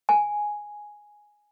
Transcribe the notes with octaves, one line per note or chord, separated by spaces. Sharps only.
G#5